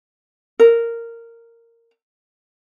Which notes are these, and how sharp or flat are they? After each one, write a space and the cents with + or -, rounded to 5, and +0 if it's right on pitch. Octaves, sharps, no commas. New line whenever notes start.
A#4 -10